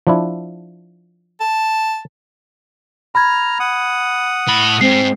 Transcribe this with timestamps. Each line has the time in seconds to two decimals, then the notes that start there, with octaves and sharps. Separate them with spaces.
0.07 F3 D4 E4
1.40 A5
3.15 A#5 B5 F6 G#6
3.60 F#5 D#6
4.47 A2 B5
4.81 G#2 C4 C7